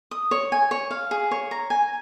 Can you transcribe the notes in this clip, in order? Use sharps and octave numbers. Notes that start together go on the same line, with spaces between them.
D#6
C#5
G#5
C#5
F5
G#4
C#5
A#5
G#5